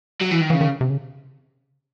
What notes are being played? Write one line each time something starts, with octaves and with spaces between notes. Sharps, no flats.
F#3
E3
D#3
C#3 E3
D#3
C3
C#3